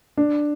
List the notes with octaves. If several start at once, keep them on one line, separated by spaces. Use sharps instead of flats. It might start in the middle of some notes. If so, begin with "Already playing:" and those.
D4